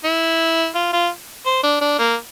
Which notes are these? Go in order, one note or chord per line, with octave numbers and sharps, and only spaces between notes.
E4
F4
F4
C5
D4
D4
A#3